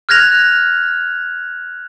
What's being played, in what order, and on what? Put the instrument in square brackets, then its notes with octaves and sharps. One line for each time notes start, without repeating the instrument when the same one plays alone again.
[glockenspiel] F6 F#6 G#6 A#6 F7